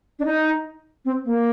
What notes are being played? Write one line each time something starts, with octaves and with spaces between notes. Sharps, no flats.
D4
D#4
C4
A#3